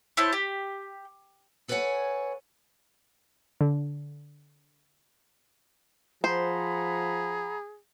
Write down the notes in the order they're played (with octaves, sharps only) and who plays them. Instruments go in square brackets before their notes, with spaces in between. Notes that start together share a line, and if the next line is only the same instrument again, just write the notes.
[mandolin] E4 C5 C#5 A5
G4
[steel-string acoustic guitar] A4 B4 C#5 D5 F#5 G#5
[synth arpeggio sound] D3
[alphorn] F3 [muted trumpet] G#4 [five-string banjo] C5 [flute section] F#5 A#5 B5